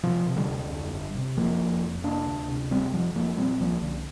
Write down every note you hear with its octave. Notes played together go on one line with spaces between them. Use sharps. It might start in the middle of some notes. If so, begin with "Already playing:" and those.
C3 F3
C3
D3 G3
D2
F2
G1
C3
F1 F3 A#3
F1
F2
C3 A#3 D4
D2
C3
F1 G3 C4
F1 F3
F1 F3 A#3
A#2 G3 C4
C2 F3 A#3
C2 D3